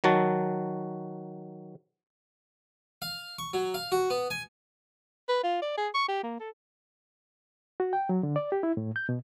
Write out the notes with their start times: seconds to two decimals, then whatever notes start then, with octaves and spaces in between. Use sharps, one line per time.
0.04 D#3 F#3 F#4 A5
3.02 F5
3.38 C#6
3.53 F#3
3.74 F5
3.92 F#4
4.10 B3
4.30 G#5
5.28 B4
5.44 F4
5.62 D5
5.77 G#4
5.94 C#6
6.08 G4
6.23 A#3
6.40 A4
7.80 F#4
7.93 G5
8.09 F#3
8.23 D3
8.36 D5
8.52 G4
8.63 E4
8.77 A2
8.96 G6
9.09 B2